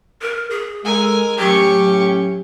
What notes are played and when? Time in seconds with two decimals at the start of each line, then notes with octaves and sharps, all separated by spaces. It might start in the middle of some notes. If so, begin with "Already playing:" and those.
0.22 A#4
0.50 G#4
0.85 G#3 A4 A#4 G#5
1.39 A1 A2 F#3 C#4 G4 C#6